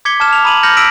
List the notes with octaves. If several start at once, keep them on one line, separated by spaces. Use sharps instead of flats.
D6 G#6 B6 C#7 G7
A5 D6 F6 G#6 E7
E7 F7
A#5 B5 D#6 D#7 F7 F#7
F6 G6 A#6 C#7 F#7
E6 A#6 B6 D7 E7 F#7